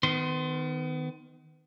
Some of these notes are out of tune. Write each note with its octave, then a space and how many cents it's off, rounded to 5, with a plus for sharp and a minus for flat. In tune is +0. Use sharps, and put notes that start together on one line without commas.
D#3 +0 B3 +35 C6 +0